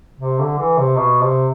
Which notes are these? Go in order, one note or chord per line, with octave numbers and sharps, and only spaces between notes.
C3
D3
E3
C3
B2
C3